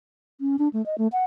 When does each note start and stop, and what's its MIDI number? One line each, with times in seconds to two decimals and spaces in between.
0.41 0.56 61
0.59 0.69 62
0.73 0.84 57
0.86 0.96 75
0.98 1.08 57
1.12 1.25 78